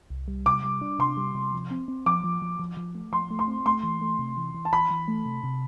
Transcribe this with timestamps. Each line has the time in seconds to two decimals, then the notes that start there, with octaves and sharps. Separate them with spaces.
0.10 C2
0.28 G3
0.46 C3 D6
0.64 G3
0.81 D4
0.99 C3 C6
1.17 G3
1.35 C3
1.53 F3
1.71 C4
1.88 C4
2.06 F3 D6
2.24 F3
2.42 F3
2.59 F3
2.77 F3
2.95 A3
3.13 F3 C6
3.31 A3
3.39 C6
3.48 C4
3.66 A3 C6
3.83 E3
4.01 A3
4.19 C3
4.37 E3
4.54 E3
4.65 A5
4.73 E3 B5
4.91 E3
5.08 A3
5.26 C3
5.44 C3